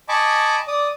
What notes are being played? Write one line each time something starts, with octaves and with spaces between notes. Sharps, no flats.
D#5 G#5 A5 B5 C#6 D6
D5 D#6